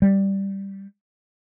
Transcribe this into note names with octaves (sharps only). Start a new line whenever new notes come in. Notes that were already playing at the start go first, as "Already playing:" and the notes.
G3